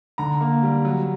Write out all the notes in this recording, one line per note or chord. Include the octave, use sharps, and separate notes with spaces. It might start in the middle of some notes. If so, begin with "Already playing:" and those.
D3 A#5
A#3
G3
F#3